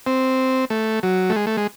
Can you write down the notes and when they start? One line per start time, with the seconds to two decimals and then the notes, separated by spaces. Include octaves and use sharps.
0.06 C4
0.70 A3
1.03 F#3
1.30 A3
1.36 G#3
1.47 A3
1.57 G#3